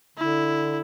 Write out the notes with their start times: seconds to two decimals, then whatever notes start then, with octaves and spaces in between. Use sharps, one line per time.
0.17 D3 E4